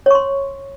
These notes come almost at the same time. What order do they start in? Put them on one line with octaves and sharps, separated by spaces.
C#5 C#6 C6